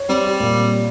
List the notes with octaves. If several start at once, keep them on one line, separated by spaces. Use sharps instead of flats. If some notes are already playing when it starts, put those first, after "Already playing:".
Already playing: C#5
G3 C4
G4
A#2